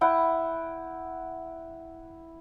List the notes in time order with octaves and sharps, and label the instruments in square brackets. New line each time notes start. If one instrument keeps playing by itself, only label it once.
[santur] E4 F#5 G5